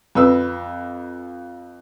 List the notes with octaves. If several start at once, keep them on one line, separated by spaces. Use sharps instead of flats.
F2 B4 E6